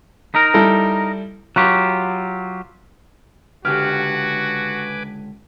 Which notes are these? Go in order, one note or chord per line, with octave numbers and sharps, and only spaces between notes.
D#4 A#4
G3 E4 A4
F#3 F4 G4 C#6 F#6
C#2 D3 F#4 G4 B4 G#5 D6 F6